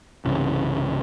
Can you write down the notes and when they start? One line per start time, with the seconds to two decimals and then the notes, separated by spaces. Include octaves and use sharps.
0.25 C2 G2 C#3 E3